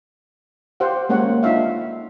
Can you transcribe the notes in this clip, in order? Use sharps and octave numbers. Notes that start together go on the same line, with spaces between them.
G4 C5 F5 F#5
G#3 A#3 C#4 C#5 F#5
D4 D#4 F4 E5 F5